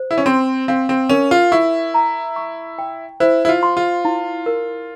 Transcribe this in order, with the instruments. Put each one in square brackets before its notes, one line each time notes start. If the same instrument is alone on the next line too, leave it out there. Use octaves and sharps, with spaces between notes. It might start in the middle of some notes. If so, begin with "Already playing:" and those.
Already playing: [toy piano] C5
[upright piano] E4
C#4
[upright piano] C4 [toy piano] C6
[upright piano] C4 [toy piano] F5
[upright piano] C4
[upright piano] C#4 [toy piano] A#4
[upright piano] F4
[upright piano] E4 [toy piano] C#6
[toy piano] A#5
C#6
G5
[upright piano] E4 [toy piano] C5
[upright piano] E4
F4
[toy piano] C6
[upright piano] F4
[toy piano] E4
A#4